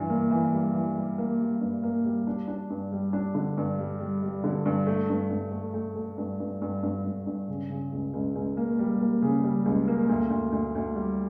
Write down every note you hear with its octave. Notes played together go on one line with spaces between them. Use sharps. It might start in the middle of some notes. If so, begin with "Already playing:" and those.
Already playing: G2 E3
A#3
E3
G3
E3
G3
A#3
G3
G2
A#3
G3
D4
D4
G2
G3
D4
D3
G2
G3
G3
G3
D3
G2
A3
G2
G2
A3
A3
A3
G2
G2
G2
G2
G2
G2
C#3
C#3
C#2
C#2
C#2
A#3
G3
A#3
C#3
G3
C#2
A#3
D2
D2
D2
D2
G3